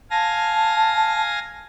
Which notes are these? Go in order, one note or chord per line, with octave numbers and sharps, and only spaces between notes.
F5 G#5 A5 A#6